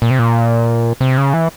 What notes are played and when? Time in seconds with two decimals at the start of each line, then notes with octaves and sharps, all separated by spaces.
0.02 A#2
0.11 C3
0.19 A#2
1.01 C3
1.18 C#3
1.33 E3